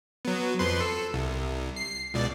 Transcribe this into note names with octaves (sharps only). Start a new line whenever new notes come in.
F#3 B3
F2 B4 C6
A4
C2
C7
C#2 B2 D5